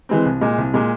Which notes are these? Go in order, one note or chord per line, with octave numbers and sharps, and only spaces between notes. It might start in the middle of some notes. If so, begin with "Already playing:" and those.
E3 G#3 C4
C2
A#2 G#3
C2
A#2 G#3